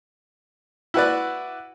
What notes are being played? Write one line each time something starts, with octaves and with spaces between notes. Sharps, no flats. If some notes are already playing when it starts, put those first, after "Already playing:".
E4 F#4 B4 D5